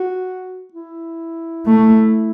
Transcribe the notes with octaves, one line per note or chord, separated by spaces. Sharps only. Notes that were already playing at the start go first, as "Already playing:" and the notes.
Already playing: F#4
E4
A3